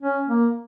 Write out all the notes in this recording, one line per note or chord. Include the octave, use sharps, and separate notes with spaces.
C#4
A#3